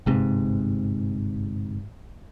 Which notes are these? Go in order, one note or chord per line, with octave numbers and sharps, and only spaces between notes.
G1 G#2 C3